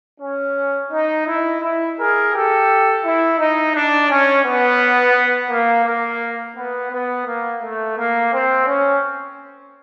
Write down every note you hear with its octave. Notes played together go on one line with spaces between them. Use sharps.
C#4
D#4
E4
E4
G#4 A#4
G4 A4
E4
D#4
D4
C#4
B3
A#3
A#3
B3
B3
A#3
A3
A#3
C4
C#4